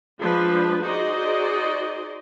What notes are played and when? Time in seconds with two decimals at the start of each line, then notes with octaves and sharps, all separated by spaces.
0.20 F3 G#3 D4 B4
0.83 D#4 F#4 G#4 C5 D5 D#5